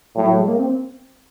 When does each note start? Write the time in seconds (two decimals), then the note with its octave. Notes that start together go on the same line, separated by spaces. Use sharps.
0.16 A2 F#3
0.27 F#3
0.38 G#3
0.47 A#3
0.59 C4